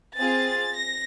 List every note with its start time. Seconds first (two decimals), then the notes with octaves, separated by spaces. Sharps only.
0.17 C4 F4 G#4 A6
0.76 A#6